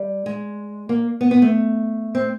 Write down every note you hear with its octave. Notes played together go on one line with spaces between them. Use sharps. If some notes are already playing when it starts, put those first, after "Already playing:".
Already playing: G3
G#3
A#3
B3
B3
A3
C4